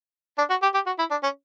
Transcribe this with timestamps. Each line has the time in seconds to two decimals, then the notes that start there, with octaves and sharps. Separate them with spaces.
0.38 D4
0.50 F#4
0.62 G4
0.74 G4
0.86 F#4
0.99 E4
1.11 D4
1.23 C#4